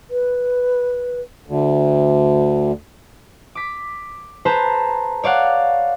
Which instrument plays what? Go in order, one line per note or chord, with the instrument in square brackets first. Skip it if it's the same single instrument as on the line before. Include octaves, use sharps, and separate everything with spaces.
[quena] B4
[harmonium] D2
[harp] D6 B6
G#4 B4 C5 A5 A#5
C#5 D5 F5 F#5